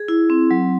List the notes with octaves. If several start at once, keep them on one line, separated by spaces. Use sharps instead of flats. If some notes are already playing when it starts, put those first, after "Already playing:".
Already playing: G#4
E4
C4
F#3